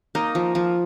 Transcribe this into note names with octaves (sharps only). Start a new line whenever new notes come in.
A#3 D#4
F3
F3